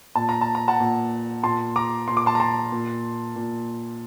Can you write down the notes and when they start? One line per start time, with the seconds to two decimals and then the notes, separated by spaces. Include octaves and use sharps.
0.15 A#2 A5
0.29 A#5
0.41 A5
0.55 A#5
0.68 F#5 A5
0.80 A#2
1.43 A#2 A5 C6
1.76 A#5 D6
2.08 A#2 C6
2.17 D6
2.26 A5 C6
2.35 A#5
2.40 A5 C6
2.72 A#2
3.36 A#2